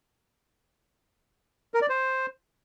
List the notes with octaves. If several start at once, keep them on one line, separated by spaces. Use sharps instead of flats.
A#4
D5
C5